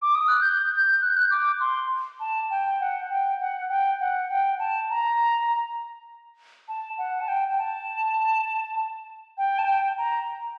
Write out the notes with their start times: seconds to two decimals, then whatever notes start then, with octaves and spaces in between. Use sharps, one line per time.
0.02 D6
0.15 D#6
0.28 F#6
0.41 G6
0.71 G6
1.02 F#6
1.09 G6
1.17 F#6
1.31 D6
1.61 C6
2.20 A5
2.50 G5
2.80 F#5
3.10 G5
3.40 F#5
3.69 G5
4.00 F#5
4.30 G5
4.59 A5
4.90 A#5
6.68 A5
6.98 F#5
7.21 A5
7.28 G5
7.48 G5
7.58 A5
9.38 G5
9.59 A5
9.67 G5
9.98 A#5